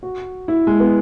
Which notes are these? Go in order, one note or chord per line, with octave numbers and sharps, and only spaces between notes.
F#4
E4
G#3
B3